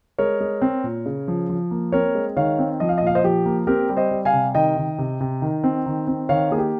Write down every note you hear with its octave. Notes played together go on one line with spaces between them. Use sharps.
G#3 A#4 C#5
G#3
C4
A#2
C#3
F3
F3
A#3
C4 A#4 C#5
G#3
D#3 C#5 F5
C4
F3 D#5
F5
D#5
A#2 F5
C5 D#5
F3 G4
A#3
C4 G4 A#4
G3
C5 D#5
G3
F5 G#5
C3
D#3 D#5 G5
D#3
C3
C3
D#3
C4
D#3
C4
D#3 C#5 F5
A#3 G#4
G4